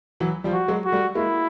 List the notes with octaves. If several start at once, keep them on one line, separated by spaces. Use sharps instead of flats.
E3 F#3
F3 G3
F#4
F#3 G#3
F#4
G3 A3
G#3 A#3 E4